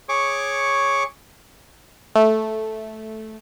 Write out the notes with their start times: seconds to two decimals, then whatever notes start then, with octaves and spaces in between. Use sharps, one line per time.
0.09 G#4 C#5 C#6 D6
2.15 A3